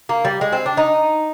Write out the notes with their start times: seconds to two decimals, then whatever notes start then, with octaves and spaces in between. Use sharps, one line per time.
0.09 A#3
0.25 G3
0.41 G#3
0.53 C4
0.66 D4
0.77 D#4